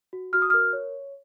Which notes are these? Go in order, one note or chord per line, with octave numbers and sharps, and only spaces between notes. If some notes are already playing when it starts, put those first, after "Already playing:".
F#4
F#4 F6
D#6
A#4 F6
C#5